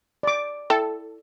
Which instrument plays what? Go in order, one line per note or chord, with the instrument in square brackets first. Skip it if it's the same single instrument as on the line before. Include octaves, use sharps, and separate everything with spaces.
[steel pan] D5 D6
[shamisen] E4 G5 [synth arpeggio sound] A4